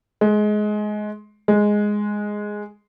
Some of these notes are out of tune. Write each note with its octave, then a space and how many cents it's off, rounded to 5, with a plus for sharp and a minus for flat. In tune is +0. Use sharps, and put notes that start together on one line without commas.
G#3 +20
G#3 +0